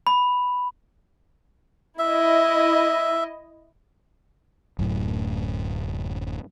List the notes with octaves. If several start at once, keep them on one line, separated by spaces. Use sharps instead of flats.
B5
E4 D#5 E5
D1 F#2 A2